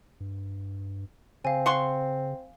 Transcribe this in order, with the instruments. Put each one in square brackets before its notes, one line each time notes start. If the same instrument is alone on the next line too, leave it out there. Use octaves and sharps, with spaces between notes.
[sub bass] G2
[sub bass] C#3 [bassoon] C4 [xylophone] F5 G#5
[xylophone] F5 [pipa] F#5 C6 C#6